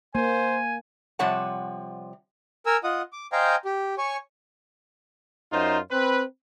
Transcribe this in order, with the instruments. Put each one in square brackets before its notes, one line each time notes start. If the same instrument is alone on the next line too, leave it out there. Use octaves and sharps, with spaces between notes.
[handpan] A#3 [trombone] C5 [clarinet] G#5
[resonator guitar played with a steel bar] C3 F3 G3 C#5 F#5 A5
[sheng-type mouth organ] A#4 G#5 E6
F4 D#5 F#5 D#6
D6
C5 D#5 F5 G5 G#5 A#5
G4
C#5 G#5 C#6
[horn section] F#2 D#4 F4 C5
C4 B4